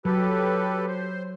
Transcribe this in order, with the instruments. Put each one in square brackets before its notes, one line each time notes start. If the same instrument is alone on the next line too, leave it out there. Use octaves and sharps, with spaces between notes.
[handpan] F#3 [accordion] G4 A4 B4
[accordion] C5